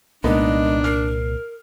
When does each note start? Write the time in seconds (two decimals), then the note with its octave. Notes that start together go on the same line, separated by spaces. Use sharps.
0.24 C2 A#2 G#3 A#3 B3 D4 D#4
0.84 A#4 F6 C7